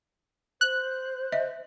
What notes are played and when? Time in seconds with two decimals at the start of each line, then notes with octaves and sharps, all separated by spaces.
0.61 C5 F#6
1.32 D#5 E5